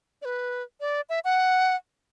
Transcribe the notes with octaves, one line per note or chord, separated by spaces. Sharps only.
D5
B4
D5
E5
F#5